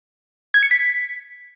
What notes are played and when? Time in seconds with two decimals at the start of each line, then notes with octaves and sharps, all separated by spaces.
0.54 G#6
0.63 C#7
0.71 B6